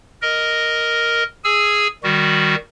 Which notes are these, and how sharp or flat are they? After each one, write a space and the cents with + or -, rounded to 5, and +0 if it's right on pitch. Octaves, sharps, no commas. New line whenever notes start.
A#4 +0 D#5 +0
G#4 +0 G#5 +0 E6 +0
D#3 +0 G3 +10 F#4 +0